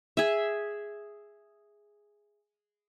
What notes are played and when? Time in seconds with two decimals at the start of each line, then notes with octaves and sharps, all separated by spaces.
0.17 G#4 E5